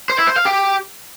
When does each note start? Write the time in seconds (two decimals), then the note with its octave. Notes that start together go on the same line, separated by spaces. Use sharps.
0.10 C5
0.19 E4
0.27 C5
0.36 F5
0.45 G4